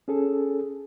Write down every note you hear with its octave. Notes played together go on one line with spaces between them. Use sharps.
C#4 G#4 A4